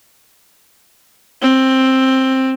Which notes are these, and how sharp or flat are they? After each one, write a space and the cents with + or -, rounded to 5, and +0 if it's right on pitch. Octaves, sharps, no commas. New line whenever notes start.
C4 +10